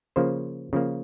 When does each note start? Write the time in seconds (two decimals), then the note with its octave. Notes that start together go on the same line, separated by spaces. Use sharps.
0.16 C#3 F3 A#3 C5
0.73 C#3 F3 A#3